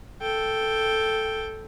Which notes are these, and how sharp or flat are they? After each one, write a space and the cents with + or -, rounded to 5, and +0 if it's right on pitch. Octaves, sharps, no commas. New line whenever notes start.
A4 +0 G5 +0